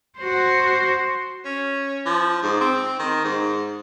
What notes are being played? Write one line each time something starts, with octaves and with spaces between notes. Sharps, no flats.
F#4 C5
C#4
F3
G#2
C4
D#3
G#2